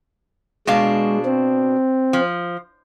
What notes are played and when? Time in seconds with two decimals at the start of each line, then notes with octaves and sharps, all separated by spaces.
0.67 B2 G#3 D4 F5
1.25 C4
2.13 F3